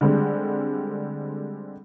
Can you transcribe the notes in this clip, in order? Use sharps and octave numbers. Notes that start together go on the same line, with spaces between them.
D3 G3 G#3 C4